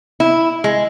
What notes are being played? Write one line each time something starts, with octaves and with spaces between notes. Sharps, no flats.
E4
G#3